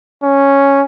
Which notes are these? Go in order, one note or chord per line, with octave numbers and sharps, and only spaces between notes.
C#4